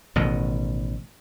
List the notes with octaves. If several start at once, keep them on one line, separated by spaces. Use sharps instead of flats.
A1 B2 D#3